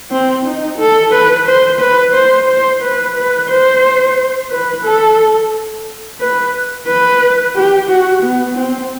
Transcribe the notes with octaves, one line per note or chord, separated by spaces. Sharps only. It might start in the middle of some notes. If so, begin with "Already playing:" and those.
C4
D#4
A4
B4
C5
B4
C5
C5
B4
B4
C5
B4
A4
B4
B4
G4
F#4
B3
C4